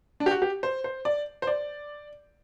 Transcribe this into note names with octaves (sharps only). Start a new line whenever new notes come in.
D4
G4
F#4
G4
C5
C5
D5
C5
D5